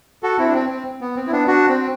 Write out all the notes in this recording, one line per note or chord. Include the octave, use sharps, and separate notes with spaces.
F#4 A4
C4 E4
D4
C4
C4
B3
C4
E4
B3 D4
D4 F#4
C4